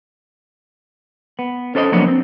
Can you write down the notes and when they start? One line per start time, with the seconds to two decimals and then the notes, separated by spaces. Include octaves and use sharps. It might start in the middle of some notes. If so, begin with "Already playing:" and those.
1.39 B3
1.75 C#4 A4 C5 D5 D#5
1.92 F3 F#3 A#3 B3 C#4 D4
2.08 C4